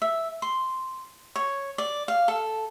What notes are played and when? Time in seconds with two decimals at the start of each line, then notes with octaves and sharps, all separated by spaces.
0.02 E5
0.42 C6
1.36 C#5
1.78 D5
2.08 F5
2.28 A4